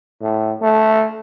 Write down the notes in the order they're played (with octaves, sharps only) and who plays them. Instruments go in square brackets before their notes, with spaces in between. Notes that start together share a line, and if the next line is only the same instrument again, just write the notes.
[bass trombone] A2
A3